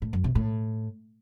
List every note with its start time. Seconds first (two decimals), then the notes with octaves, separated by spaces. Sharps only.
0.02 A2
0.13 F#2
0.24 C3
0.35 A2